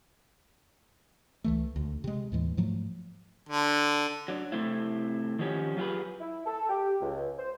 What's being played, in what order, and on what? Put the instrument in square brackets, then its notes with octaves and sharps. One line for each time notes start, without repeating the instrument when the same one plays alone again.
[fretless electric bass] C#2 E3 A3
D2
C3 G#3
D#2 A2 E3 G#3
G#2 F3 F#3 A3
[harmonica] D3
[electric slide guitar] F#3 D4
C3 A3 C4 E4
D#3 F3 F#3 C#4 G4 C#5
F#3 A3 F4 G4 G#4 B4
[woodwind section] E4
A4
G4
C#2
C5